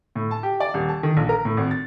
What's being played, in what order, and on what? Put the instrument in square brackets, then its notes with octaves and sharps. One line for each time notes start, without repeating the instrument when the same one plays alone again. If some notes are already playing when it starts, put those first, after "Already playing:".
[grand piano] A2
A5
G4
D5
D#1
A5
D#3
A#1
A#4
A2
G#1
A6